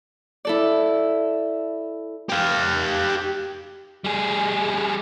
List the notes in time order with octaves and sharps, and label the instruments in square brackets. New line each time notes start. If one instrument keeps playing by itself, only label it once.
[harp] E4 A4 D5
[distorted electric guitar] G4 F5
[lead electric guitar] G3 G#4